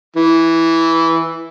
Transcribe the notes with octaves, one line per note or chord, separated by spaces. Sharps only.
E3